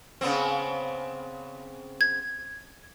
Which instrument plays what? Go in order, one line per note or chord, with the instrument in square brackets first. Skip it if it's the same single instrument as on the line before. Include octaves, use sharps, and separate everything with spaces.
[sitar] C#3 B3 C4
[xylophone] G#6